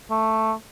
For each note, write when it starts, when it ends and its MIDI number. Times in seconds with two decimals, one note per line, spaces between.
0.10 0.53 57